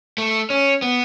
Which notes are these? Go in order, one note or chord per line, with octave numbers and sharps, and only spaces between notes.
A3
C#4
B3